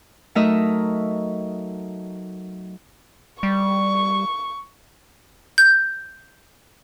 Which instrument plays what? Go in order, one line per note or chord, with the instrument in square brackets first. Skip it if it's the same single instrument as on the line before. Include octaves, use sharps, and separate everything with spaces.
[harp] F#3 A3 D#4 A#4 D#5 E5
[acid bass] G3 [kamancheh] C#6
[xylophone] G6